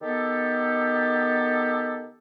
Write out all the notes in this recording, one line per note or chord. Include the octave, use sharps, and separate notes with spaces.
D#3 B3 G4 A4